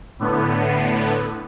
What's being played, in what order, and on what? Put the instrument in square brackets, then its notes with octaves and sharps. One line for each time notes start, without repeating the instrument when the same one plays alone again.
[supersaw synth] A2 D3 B3